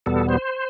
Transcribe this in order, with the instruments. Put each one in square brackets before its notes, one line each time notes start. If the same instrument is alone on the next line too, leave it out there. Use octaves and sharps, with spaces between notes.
[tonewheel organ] E2 B2 G3 B3 A4
C5